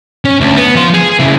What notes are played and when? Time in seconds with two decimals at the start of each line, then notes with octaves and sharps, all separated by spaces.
0.25 C#4
0.41 D2
0.56 B3
0.75 F3 C6
0.94 G#4
1.20 C#3 E4